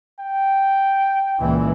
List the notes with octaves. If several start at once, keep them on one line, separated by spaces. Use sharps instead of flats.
G5
C#2 A#2 E3